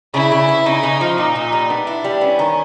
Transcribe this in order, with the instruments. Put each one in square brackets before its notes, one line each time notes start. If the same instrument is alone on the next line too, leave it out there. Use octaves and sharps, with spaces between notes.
[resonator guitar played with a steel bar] C#3 [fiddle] E4
[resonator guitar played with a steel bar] C#3
B3
[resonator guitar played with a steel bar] C#3 [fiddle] D#4
[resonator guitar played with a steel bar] C#3
F3
[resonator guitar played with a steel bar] A#2 [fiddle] D#4
[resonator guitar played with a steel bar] A#2
G3
[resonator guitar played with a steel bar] B3 [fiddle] D4
[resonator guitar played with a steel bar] E4
G3
[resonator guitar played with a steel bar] B3 [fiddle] C#4
[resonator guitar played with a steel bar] D#3